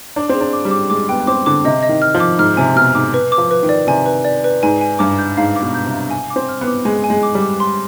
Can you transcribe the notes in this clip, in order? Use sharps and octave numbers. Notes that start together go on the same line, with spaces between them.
D4 D6
C4
G#4
D4
D6
G3
D6
G#3 D6
B3 G5
B3
C4 D6
D3 D6
C3 D#5
D#5
D#3
F6
F3
D6
G#2 F6
C3 G#5
B2 F6
G#2 D6
B4
D6
F3
B4
D#3
D5
C3 G#5
B4
D5
B4
G#2 G#5
G#5
G2 D6
G6
G#2 F5
D6
B2
G6
C3
F5
G#5
D6
C4
F6
B3
D6
G#3 G#5
G#5
G#3
D6
G3
D6
C6